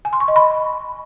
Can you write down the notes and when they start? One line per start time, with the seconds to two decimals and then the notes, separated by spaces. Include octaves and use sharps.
0.05 G#5
0.13 C6
0.20 C#6
0.28 D#5
0.36 B5